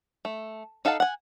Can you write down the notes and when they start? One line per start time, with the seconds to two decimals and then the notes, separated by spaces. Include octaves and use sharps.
0.25 A3
0.85 D#4 A4 F5 F#5 A5
1.00 F#5 G#5